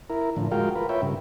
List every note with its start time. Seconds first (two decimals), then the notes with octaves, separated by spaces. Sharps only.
0.10 E4 A#4
0.36 A2 D3 F3
0.51 G#3 F4 F#4 A#4 F5 G5
0.76 F4 A#4 B4
0.89 F4 B4 C#5 E5 G5
1.02 G2 C#3